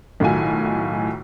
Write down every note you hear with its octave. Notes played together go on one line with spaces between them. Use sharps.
B1 A2 D#3 F4 F#4 G#5